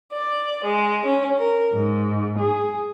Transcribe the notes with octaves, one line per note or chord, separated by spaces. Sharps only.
D5
G#3
C#4
A#4
G#2
G#4